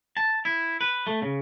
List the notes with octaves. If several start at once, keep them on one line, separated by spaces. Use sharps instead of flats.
A5
E4
B4
A3
C#3